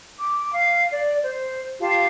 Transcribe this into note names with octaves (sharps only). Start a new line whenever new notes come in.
D6
F5
D5
C5
F4 G4 F5 A5